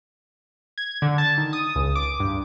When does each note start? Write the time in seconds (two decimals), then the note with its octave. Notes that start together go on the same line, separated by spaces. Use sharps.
0.78 G#6
1.02 D3
1.18 A5
1.38 D#3
1.53 D#6
1.76 C#2
1.95 D6
2.20 G2